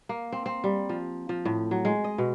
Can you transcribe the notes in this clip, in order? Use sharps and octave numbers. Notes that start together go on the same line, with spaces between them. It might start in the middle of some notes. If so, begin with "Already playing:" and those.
A#3
C4
C4
G3
F3
F3
A2
F#3
G#3
D#5
B2